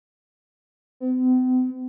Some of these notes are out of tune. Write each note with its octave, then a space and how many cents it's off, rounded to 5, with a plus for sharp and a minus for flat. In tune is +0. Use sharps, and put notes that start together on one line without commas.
C4 -45